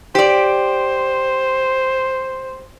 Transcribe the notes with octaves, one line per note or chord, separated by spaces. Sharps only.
G4 C5 D5